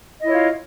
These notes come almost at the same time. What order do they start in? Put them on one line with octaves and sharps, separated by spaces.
D#5 E4 C#5 F4